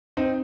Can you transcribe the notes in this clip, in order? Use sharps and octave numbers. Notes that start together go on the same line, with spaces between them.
C4 D#4